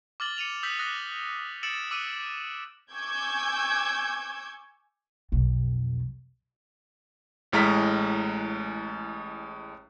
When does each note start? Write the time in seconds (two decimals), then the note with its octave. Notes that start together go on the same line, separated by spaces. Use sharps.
0.20 D6 F6 A6 F#7 G7
0.37 C#7 D#7 F7 F#7
0.63 D#6 E6 G6 B6 F#7
0.79 D#6 F#6 A#6
1.63 E6 A6 C#7 D7 E7 F#7
1.91 D6 E6 F#6 D#7
2.92 G#5 C#6 D6 E6 G6 G#6
5.32 B1 F2
7.52 A1 A2 G#3 A#5 F6 B6